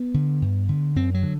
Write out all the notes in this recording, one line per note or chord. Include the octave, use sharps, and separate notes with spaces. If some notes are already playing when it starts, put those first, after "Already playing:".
Already playing: B3
D3
G2
D3
F#2 C4
F#3
D3